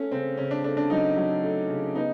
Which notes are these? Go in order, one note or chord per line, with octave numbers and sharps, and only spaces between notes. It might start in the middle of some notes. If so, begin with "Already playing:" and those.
Already playing: A3 C#4
C#3 C4
C#3 C#4
D4
A3 D4
D4
F#3 D#4
F#3
A3
C#3
B3 D#4